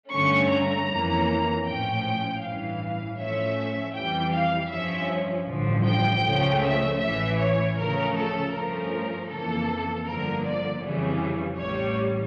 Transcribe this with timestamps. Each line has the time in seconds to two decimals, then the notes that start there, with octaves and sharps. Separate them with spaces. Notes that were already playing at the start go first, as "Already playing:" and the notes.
0.12 G2 D3 A3 C#4 C#6
0.51 A#5
0.88 F2 E3 A#3 C#4
1.65 A#1 A2 F3 C#4 G5
2.42 A1 G2 E3 F5
3.18 A2 F3 A3 C#4 E5
3.95 F2 E3 G3 G5
4.32 F5
4.71 G2 F3 C#4 E5
5.47 A1 G2 D3 F3
5.86 G5
6.24 C#2 C#3 F3 A3 C#4
6.62 E5
7.00 A1 A2 E3 E5
7.38 C#5
7.77 D2 C#3 F3 A3 C#4 A#4
8.15 A4
8.53 G2 F3 A3 C#4 A#4
9.30 F2 C#3 E3 A#3 A4
10.06 G1 G2 D3 F3 A#3 A#4
10.44 D5
10.82 F2 C#3 E3 G3 C#4
11.59 A1 A2 G3 C#5